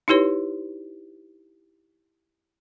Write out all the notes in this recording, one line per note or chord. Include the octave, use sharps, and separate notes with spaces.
D#4 E4 G4 B4 C#5